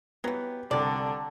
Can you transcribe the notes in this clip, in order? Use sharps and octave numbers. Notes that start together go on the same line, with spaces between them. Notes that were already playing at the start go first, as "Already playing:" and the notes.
E3 F#3 B3 G4
C2 D3 A4 D5 F#5 A#5